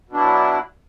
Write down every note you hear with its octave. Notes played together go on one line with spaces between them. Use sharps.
B2 F#3 D4 E4